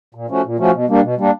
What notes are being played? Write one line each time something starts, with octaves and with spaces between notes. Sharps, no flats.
A#2
F3 A3 C#4 F#4
A#2
F3 A3 C#4 F#4
B2
G3 A#3 D4
B2
G3 A#3 D4